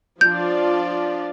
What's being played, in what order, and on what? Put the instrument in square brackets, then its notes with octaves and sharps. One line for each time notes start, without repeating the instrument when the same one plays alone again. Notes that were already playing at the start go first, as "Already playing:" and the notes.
[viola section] F3 D4 F4 D5 [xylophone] G6